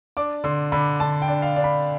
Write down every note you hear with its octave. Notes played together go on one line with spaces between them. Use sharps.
D4 D6
D3 C6
D3 B5
D3 A5
G5
D4
F5
D4
B5